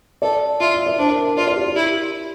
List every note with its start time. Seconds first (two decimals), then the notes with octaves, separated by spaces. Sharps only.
0.22 A4 D5
0.60 F4 E5
0.73 E5
0.86 D5
0.98 D4 C5
1.08 A#4
1.18 A#4
1.37 F4 D5
1.47 D5
1.56 G4
1.67 G4
1.76 E4